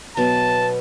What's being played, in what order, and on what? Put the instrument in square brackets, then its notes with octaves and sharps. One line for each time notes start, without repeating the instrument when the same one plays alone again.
[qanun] B2 F#3 B3 [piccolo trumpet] A5